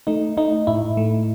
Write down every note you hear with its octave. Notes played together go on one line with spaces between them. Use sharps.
A3 D#4
A3 D#4
A2 E4
A3